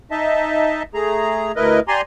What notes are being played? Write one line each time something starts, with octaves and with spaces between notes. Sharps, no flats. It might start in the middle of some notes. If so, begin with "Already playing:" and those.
D#4 D#5 E5 A5
A3 G#4 A#5
D2 E4 A#4 B4 D#5
G4 D5 G#5 A#5 C6